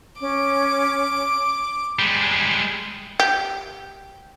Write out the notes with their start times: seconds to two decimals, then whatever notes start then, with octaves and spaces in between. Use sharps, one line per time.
0.21 C#4 D6
1.99 G3 G#3
3.20 G4